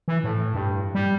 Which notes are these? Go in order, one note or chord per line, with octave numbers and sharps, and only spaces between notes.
E3
A2
G2
G3